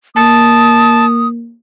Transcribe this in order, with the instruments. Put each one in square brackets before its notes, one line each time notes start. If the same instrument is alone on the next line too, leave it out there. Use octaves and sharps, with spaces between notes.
[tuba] A#3 [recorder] A5 [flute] D#6